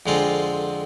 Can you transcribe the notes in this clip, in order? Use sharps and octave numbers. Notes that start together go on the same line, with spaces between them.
F2 D3 G#3 C4 F4